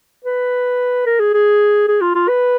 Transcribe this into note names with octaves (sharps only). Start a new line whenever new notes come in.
B4
A#4
G#4
G#4
G#4
F4
F4
B4